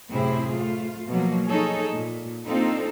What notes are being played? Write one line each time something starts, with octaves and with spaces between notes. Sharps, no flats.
F#2 A2 C3 C4 E4 G#4
A3 F4
B2 F3 F#3 A#3
D#4 G#4 A4 C#5
A#2
A#3 C4 D4 D#4 F4 A4